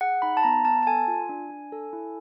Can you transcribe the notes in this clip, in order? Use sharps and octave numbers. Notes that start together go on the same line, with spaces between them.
G#4 F#5
D#4 B5
A5
B3 A#5
B3 A5
A5
A4 G#5
F4
D4
D4
A4
E4